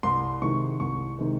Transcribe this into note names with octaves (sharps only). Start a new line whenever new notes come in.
C2 C6
C3 D#3 G#3 C#6
C2 C#6
C3 D#3 G#3